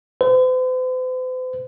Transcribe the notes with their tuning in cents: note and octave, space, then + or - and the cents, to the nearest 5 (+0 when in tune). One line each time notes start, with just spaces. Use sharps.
C5 -45